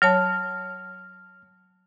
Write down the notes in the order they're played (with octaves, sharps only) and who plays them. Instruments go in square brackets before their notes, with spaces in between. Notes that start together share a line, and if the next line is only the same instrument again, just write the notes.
[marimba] F#3 C#5 A5 [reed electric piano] F6